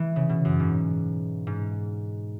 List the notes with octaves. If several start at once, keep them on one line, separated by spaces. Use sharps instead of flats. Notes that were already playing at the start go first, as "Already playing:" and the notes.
Already playing: E3 G#3
C#3
B2
F#2
G#2
G#2